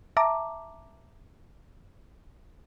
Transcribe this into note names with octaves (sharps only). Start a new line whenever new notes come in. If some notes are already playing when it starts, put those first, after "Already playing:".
E5 A5 A#5 D6